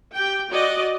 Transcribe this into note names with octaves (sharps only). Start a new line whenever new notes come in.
G4 G5
F#4 D5 D#5